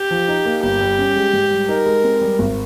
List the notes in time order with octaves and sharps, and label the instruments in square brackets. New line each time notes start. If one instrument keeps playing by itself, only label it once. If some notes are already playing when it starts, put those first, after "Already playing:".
Already playing: [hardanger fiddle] G4
[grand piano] F3
D#4
A#3
[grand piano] G1 [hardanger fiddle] G4
[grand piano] G3
C#4
G#3
G#2
G3
[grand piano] D#4 [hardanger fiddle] A#4
[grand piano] G#3
C4
G3
G#1